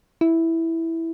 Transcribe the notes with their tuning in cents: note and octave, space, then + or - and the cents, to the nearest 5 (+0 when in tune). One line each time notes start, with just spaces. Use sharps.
E4 -5